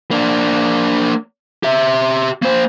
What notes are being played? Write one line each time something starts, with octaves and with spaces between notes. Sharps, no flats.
A#3 D4
G4 E5
A#3 C5